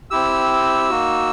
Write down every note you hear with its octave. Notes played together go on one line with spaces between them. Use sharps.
C4 E4 G4 E6
A#3 D#4 F#4